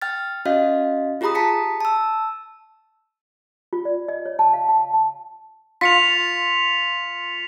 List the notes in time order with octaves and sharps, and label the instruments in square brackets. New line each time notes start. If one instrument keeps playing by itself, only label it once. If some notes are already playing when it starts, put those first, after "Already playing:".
[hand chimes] G5 F6 A6
C#4 F#4 D#5 F5
F4 G4 G#4 A#5 B5 D#6
A5 B6 C#7
A5 E6
[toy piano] F4
D5
D#5
C#5
A5
F5
A5
A5
[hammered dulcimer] F4 [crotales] B6 C#7 F7